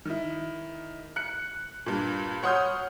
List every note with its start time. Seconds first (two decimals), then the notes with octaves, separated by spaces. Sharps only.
0.05 D#3 E4
1.16 F#6 C#7
1.86 G2 A#2
2.43 C#5 F#5 C6 D#6 F6 G6